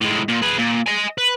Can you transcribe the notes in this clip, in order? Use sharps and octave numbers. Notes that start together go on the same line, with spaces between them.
A2 G#3
A#2
G#4 B4
A#2
D#5 G#5
B4